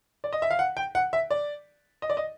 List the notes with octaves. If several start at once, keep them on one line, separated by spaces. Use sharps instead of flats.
D5
D#5
E5
F5
F#5
G5
F#5
E5
D5
D#5
D5
D#5